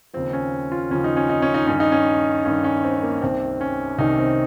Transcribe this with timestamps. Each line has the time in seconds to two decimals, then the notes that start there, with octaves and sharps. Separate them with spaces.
0.13 D#2 C#3 F3 C4
0.33 C#4
0.72 F4
0.90 D#2 C#3 F3 C#4
1.04 D#4
1.17 C#4
1.29 D#4
1.42 C#4
1.54 D#4
1.67 G2 D#3 C#4
1.80 D#4
1.92 C#4
2.45 G2 D#3 C#4
2.64 C#4
2.84 C4
2.95 C4
3.02 A#3
3.22 C2 C3 D#3 C4
3.61 C#4
3.98 C2 C3 D#3 D#4
4.19 C4